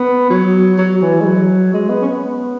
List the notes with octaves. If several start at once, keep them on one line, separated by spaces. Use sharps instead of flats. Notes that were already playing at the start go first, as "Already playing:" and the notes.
Already playing: B3
F#3
F#3
E3
G#3
F#3
G#3
B3
C#4
B3